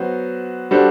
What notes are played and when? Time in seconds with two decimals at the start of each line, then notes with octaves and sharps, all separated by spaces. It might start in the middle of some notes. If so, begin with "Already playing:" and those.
Already playing: F#3 B3 F#4 C5
0.71 G3 D4 F#4 A4 C5